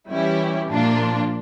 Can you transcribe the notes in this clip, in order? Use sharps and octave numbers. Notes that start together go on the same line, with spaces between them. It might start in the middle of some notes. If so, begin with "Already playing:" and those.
E3 G3 C#4 E4 G4
A#2 F3 A#3 D4 F4